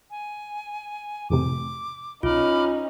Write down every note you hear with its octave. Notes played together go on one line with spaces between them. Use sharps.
G#5
F2 A2 C3 D6
C2 C#4 D#4 F4 B5 D6 F6